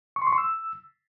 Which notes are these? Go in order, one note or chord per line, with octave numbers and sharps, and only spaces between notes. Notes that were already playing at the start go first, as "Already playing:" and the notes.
C#6
C6
C#6
C6
E6